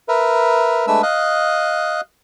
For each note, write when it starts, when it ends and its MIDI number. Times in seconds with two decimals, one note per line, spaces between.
0.08 0.86 70
0.08 0.86 71
0.08 0.86 76
0.87 1.02 56
0.87 1.02 57
0.87 1.02 62
0.87 1.02 71
0.87 1.02 76
0.87 1.02 88
1.03 2.01 75
1.03 2.01 77
1.03 2.01 87
1.03 2.01 90